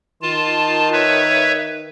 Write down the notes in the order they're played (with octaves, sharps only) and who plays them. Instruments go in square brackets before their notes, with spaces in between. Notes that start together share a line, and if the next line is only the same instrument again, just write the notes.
[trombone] D#3 [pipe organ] F4 A5
[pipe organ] B4 C#5 E5